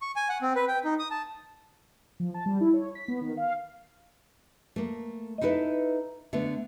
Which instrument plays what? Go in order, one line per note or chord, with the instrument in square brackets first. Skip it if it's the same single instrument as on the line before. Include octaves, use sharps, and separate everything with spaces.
[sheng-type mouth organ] C#6
G#5
F#5
C4
B4
G5
D#4
D#6
A5
[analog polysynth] F3
A5
G3
E4
C#5
B6
B3
D#3
F5
[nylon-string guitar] A3 A#3
D#4 E4 A4 B4 E5
D3 A3 B3